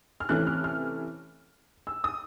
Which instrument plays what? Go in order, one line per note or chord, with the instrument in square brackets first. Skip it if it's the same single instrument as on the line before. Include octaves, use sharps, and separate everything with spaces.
[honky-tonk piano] F6
C3 E3 A3 C#4 F#6
F6
F6
E6
D#6